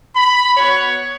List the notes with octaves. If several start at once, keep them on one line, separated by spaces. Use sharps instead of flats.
B5
B3 F#4 C#5